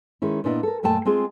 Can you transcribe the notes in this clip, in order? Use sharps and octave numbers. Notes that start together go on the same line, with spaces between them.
D#3 G#3 C#4 E4
A#2 B3 D4 E4 D#5
A4 A#4
F#2 A#2 A3 G5 A5
G#3 C4 F4 G#4